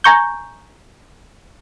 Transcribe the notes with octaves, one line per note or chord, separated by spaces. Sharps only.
G#5 A#5 C#6 G6